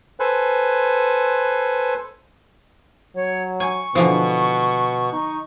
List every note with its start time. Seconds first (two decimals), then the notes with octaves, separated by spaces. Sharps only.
0.20 A4 B4 C5 G#5
3.15 F#3 C#5
3.60 G#5 C#6
3.95 B2 D3 E3 F3
5.13 D#4